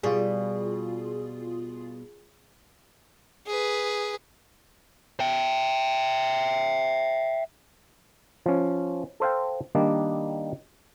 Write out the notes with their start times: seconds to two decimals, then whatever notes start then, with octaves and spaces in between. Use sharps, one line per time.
0.03 B2 G3 F4 G#4
3.47 G#4 B4
5.20 E5 G5
8.46 F3 C#4
9.20 A4 C5 F5 G5
9.75 D#3 G3 A#3 D4 D#4